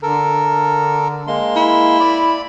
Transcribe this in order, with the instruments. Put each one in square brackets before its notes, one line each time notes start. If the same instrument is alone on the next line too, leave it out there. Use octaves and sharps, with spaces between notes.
[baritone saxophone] D3 [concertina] A4 A#4
[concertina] G#3 A#3 C6
[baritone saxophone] E4
[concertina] D5 B5